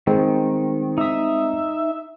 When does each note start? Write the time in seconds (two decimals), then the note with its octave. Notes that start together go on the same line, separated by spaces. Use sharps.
0.07 D#3 G#3 C4
0.98 D#4 E5 D#6